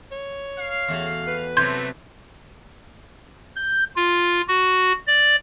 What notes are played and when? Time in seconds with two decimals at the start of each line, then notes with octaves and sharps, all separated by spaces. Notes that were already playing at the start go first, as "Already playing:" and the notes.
0.12 C#5
0.57 F5
0.88 E2 A3 F#4
1.27 B4
1.57 C3 F#3 A3 C6 G6 G#6
3.56 G6
3.97 F4
4.48 F#4
5.07 D5